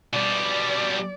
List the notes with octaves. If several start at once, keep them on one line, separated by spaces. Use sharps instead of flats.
B2 G3 D5